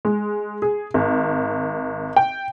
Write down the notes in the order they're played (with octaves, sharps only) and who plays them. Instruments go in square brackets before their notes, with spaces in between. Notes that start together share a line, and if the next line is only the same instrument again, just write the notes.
[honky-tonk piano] G#3
G#4
G#1
G5